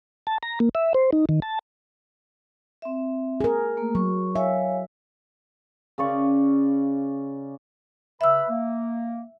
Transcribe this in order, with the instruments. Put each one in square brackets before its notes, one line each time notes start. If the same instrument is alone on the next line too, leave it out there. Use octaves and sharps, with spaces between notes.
[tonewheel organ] A5
A#5
A#3
E5
C5
D#4
D#3
A5
[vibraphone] C4 E5
[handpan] G#4 A#4 [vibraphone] G#5
[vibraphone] A3 A#3
[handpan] F#3 [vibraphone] C#6
[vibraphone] C#5 F5 G#5 [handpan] E5
[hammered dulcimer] C#3 C#4 D5 C#6
[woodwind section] C#3 B4 B5 [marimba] E5 E6
[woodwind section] A#3